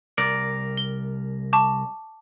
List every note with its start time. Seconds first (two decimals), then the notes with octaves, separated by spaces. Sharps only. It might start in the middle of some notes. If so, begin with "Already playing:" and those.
0.18 C2 A#4 D5
0.77 G7
1.53 A5 C#6 D6